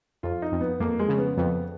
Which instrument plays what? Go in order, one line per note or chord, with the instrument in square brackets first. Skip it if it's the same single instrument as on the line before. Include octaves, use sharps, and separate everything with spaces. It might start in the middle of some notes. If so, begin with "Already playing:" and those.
[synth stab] F2 [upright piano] F4
[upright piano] D#4
[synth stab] F2
[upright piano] B3
[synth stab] F2 [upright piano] A#3
[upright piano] G#3
[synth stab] C#3
[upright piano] B3
[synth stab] F2 [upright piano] B3